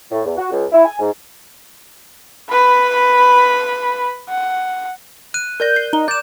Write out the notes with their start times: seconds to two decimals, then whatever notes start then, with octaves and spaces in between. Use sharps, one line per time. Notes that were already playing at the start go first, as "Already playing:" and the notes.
0.12 A2
0.25 E2
0.36 F#4
0.51 C#2
0.72 E4
0.85 G#5
1.00 G#2
2.49 B4 B5
4.29 F#5
5.34 F#6 D#7
5.60 A#4 D5 G6 A#6
5.76 C7
5.93 D#4 A#5 G7
6.08 D5 G6 E7